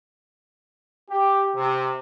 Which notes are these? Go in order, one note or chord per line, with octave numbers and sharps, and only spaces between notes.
G4
C3